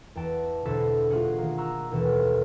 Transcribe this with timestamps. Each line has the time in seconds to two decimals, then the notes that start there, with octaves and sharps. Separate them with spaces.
0.15 E2 G5 A5 D7
0.65 E2 B2 D3 A4 C5 B6
1.10 A3 F4 F#4 G#4 F#5
1.38 D#3 A#3
1.58 A#5 C#6 E6 F#6
1.91 D#2 B2 E3 A4